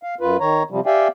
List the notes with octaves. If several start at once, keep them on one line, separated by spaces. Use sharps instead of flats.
F5
F#2 F4 B4
D#3 C#5 A#5
C3 F3 G3
G4 D5 E5 F5 G5 G#5